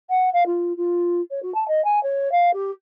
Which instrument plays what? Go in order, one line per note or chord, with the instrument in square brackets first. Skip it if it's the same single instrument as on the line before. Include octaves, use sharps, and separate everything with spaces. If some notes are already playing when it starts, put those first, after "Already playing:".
[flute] F#5
F5
F4
F4
C#5
F#4
A5
D#5
G#5
C#5
F5
G4